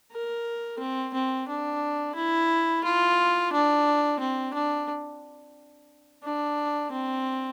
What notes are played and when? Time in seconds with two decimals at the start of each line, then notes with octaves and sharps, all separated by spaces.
0.12 A#4
0.79 C4
1.14 C4
1.49 D4
2.15 E4
2.84 F4
3.53 D4
4.20 C4
4.54 D4
6.24 D4
6.92 C4